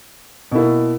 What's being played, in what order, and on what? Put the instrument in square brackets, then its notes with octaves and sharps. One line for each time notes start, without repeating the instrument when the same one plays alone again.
[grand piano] B2 A#3 E4